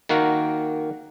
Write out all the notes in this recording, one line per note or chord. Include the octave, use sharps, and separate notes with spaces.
D#3 A#3 F#4 A#4